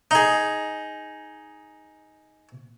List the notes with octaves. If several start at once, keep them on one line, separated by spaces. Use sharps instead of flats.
D#4 G#4